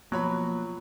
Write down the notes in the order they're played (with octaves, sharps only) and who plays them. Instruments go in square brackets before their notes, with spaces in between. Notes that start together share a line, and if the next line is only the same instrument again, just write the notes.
[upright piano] B2 C#5 B5 [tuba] F3 [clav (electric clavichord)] F#3 [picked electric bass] A#3